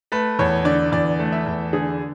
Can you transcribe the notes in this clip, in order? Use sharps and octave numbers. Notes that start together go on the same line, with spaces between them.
A3 B4
E2 C#5
D3 D5
E2 D5
A3
E5
E2
D3 G#4